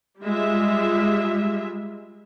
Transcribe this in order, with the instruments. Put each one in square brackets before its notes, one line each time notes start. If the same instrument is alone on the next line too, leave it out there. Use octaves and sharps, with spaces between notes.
[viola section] G3 G#3 F4 E5